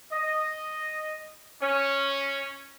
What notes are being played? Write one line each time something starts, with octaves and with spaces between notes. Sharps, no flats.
D#5
C#4